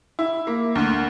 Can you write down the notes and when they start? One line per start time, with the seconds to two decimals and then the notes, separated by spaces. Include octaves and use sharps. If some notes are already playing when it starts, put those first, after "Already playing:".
0.19 E4
0.47 A#3
0.75 D2